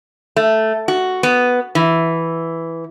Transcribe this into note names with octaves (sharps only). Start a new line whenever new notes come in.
A3
F#4
B3
E3